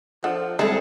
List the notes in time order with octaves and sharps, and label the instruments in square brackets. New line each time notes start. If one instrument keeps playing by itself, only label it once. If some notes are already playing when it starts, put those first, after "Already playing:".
[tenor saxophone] F3 [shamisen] D4 A4 F#5
[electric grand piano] G3 G#3 C4 [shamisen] E4 D5 [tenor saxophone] G#4 [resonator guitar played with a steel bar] A4